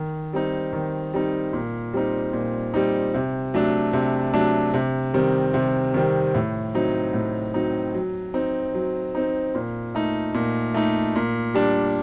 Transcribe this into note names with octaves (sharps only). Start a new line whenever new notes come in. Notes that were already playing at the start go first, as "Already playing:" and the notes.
Already playing: D#3
G3 C4 D#4
D#3
G3 C4 D#4
A#2
G3 C4 D#4
A#2
G3 C4 D#4
C3
F#3 A3 D4
C3
F#3 A3 D4
C3
D#3 G3 C4
C3
D#3 G3 C4
A2
F#3 C4 D#4
A2
F#3 C4 D#4
F#3
C4 D#4
F#3
C4 D#4
A#2
A3 D#4
A#2
A3 D#4
A#2
G3 D4